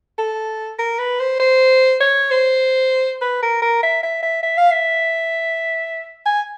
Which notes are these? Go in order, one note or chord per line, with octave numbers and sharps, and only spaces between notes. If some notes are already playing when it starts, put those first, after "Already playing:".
A4
A#4
B4
C5
C5
C#5
C5
B4
A#4
A#4
E5
E5
E5
E5
F5
E5
G#5